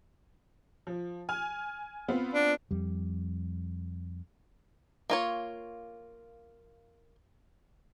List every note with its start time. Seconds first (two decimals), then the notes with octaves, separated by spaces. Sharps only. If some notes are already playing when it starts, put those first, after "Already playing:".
0.87 F3
1.29 G#5 F6
2.08 B3 C4 F4
2.34 D4
2.71 F2 G3
5.10 A#3 F4 C#5